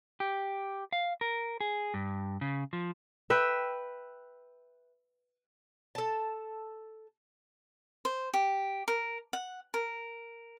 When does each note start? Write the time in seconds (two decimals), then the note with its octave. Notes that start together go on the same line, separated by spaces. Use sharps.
0.20 G4
0.93 F5
1.21 A#4
1.61 G#4
1.94 G2
2.41 C#3
2.73 F3
3.30 B4 E5 G5
5.95 A4 A5
8.05 C5
8.34 G4
8.88 A#4
9.33 F#5
9.74 A#4